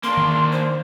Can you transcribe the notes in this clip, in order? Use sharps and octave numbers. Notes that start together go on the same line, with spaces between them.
A#3 D4 C6
D#3
C5